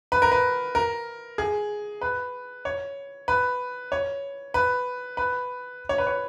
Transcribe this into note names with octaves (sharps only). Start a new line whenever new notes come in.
B4
A#4
B4
A#4
G#4
B4
C#5
B4
C#5
B4
B4
C#5
B4
C#5